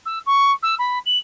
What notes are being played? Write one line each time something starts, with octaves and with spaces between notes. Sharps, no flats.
E6
C#6
E6
B5
F#7